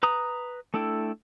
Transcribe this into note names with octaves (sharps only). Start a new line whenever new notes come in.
B4 A#5 D#6
A3 D4 E4 A4 G5